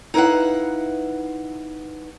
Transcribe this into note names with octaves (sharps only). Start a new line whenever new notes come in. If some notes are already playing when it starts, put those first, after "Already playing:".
D#4 E4 B4 F5 F#5